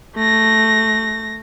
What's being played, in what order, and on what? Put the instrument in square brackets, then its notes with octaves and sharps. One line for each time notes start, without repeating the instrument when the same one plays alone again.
[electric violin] A3 A#6